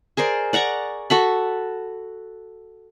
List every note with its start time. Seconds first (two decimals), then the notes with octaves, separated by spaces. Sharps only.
0.17 G#4 A#4 C5 D5
0.53 D5 F#5 A#5 C#6
1.10 F#4 A4 B5